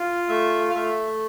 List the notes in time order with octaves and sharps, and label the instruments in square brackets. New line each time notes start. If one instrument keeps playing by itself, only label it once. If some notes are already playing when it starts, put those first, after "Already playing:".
Already playing: [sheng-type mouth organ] F4
A3 E5
F5
A3 E5